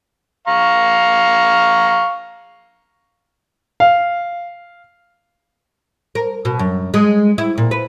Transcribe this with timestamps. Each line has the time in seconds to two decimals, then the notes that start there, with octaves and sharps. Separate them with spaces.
0.48 F5 A#5 C#6
3.80 F5
6.15 A#4
6.45 B2
6.59 F#2
6.94 G#3
7.38 E4
7.58 A#2
7.71 B4